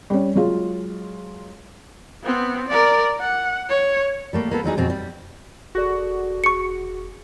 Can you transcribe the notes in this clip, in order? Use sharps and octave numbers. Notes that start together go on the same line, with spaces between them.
G3 C#4
F#3 G#3 F4
B3 C4
A#4 D5
F#5
C#5
G3 A3 A#3
A#3 B3 A4
F#3 G3 D#4 G#4
F2 B2 C4
G3
E1 F#4 G#4 A4 D5
G#4 C#6 C#7